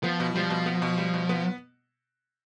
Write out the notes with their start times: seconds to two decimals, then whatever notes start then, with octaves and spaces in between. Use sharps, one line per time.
0.03 F3 B3
0.20 B2
0.35 F3 G3
0.50 B2
0.66 B3
0.82 B2
0.98 G3
1.14 B2
1.29 B3